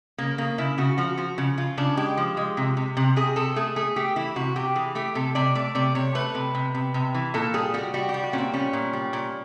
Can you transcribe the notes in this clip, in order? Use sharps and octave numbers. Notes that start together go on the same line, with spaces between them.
C#3 A#3
C#3 A#3
C#3 E4
C#3 F#4
F3 F#4
F3 F#4
C#3
C#3 F4
C#3 D4
G#3 G4
F3
G#3
C3
C3
C3
C3 G#4
C3 A4
A3 G#4
A3 G#4
A3 G4
E3 E4
C3 F#4
C3 G4
E3 G#4
A3 G4
C3 A4
C3 D5
A3 D5
C3 D5
C3 C#5
A3 B4
C3
C3
C3
C3
E3
A#2 A4
G3 G#4
G3 F#4
G3 F#4
G4
G3
F#4
A#2 C#4
C4
G3 C#4
A#2
G3
A#2